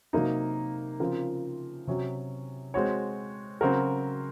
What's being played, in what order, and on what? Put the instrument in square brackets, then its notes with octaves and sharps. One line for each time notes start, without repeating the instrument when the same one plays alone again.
[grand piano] C3 F#3 A#3 D#4
C#3 F3 C4 F4 A#4
C3 F#3 C#4
G#3 C4 F#4 C#5
C#3 F#3 C4 F#4 A#4